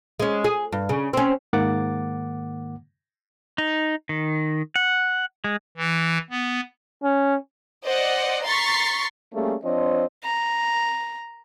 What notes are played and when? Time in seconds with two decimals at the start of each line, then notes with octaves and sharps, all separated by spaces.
0.20 G#3 C#4
0.44 G#4
0.72 G2
0.89 C#3
1.13 C4 C#4
1.53 G#2 D#3 A#3 F#5 D6 A6
3.58 D#4
4.09 D#3
4.76 F#5
5.44 G#3
5.77 E3
6.30 B3
7.03 C#4
7.84 C5 D5 D#5 F#5
8.43 A#5 C6 C#6 A6 B6 C7
9.34 G3 A3 A#3 C#4 G#4
9.64 F3 C4 D4 C5 C#5 D#5
10.24 A#5